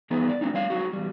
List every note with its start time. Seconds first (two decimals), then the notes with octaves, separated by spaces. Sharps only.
0.10 G2 E3 B3 D#4 G#4 B4
0.29 D5
0.41 F3 A3 B3 C4 D4 D#4
0.54 G3 C#5 F5
0.70 F#3 G#3 D#4 F#4
0.93 E2 G3